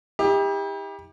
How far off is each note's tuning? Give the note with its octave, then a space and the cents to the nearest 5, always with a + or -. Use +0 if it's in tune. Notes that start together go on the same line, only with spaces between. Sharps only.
E4 -45 G4 +30